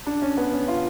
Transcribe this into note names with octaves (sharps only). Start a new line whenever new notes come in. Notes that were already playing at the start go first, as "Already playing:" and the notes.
D4
C#4
B3
C#4
F4